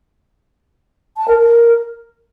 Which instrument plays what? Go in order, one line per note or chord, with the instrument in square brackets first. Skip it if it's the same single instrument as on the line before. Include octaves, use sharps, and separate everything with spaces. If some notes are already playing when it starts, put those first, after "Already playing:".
[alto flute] A5
A#4
A#4